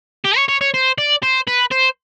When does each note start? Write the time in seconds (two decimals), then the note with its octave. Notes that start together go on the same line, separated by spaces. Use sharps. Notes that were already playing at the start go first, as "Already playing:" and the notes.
0.25 G4
0.37 C#5
0.49 C#5
0.61 C#5
0.74 C5
0.98 D5
1.23 C5
1.47 B4
1.71 C5